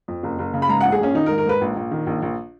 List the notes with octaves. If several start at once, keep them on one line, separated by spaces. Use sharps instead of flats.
F2
F#1
F#1
C#3
B5
G#2 A#5
A#1 F#5
G#4
A#1 C#4
D#3 D#4
A#4
G#2
A#4
G#2 B4
A#1
A#1
D#3
A#1
A#1